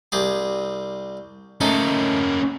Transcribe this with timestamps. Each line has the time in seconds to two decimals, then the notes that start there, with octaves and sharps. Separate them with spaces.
0.12 C2 G4 G#4
1.61 A3 A#3 C#4 D#4 A4